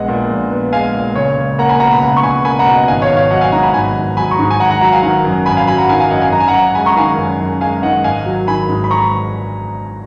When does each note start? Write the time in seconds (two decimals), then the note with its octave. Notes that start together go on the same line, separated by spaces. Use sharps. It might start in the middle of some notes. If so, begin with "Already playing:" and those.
Already playing: A#1 G#3 B3 D#5 F#5
0.08 A#2
0.30 A#1
0.51 B3
0.72 G#3 F5 G#5
0.94 A#2
1.16 C#2 C#5
1.37 C#2
1.59 A#3 F#5 A#5
1.69 G#5 B5
1.80 B2 F#5 A#5
1.93 B5
2.02 C#2 F#5 A#5
2.17 C#6
2.23 C#2 G#5 B5
2.45 A#3 G#5 B5
2.59 F#5 A#5
2.66 B2
2.73 D#5 F#5
2.88 G#1 F5 G#5
3.02 C#5 F5
3.10 G#1
3.17 C#5 F5
3.31 F#3 D#5 F#5
3.41 F5 G#5
3.52 G#2 F#5 A#5
3.63 G#5 B5
3.74 G#1 G#5 B5
3.96 G#1
4.17 F#3 G#5 B5
4.31 A#5 C#6
4.39 G#2
4.50 G#5
4.60 G#1 F#5 A#5
4.71 F#5 A#5
4.81 F#3 F#5 A#5
4.92 F5 G#5
5.03 D#3 F#5 A#5
5.25 F#2
5.46 G#1 G#5 B5
5.57 F5 G#5
5.67 F#3 G#5 B5
5.78 F#5 A#5
5.89 D#3 F5 G#5
6.00 F5 G#5
6.11 F#2 D#5 F#5
6.22 F5 G#5
6.32 F#2 A#5
6.40 G#5
6.48 F#5 A#5
6.54 F#2
6.75 G#3 G#5 B5
6.86 A#5 C#6
6.97 D#3 F5 G#5
7.18 F#2
7.40 F#2
7.61 G#3 F5 G#5
7.82 D#3 D#5 F#5
8.04 G#1 F5 G#5
8.26 F#3
8.47 D#3 G#5 B5
8.69 G#2
8.84 B5
8.91 A#5 C#6